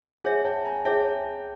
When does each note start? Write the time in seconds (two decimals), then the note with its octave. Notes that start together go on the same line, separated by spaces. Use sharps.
0.24 G#4 C#5 E5 F#5 G#5
0.45 G5 A5
0.65 G#5 A#5
0.85 G#4 C#5 E5 G5 A5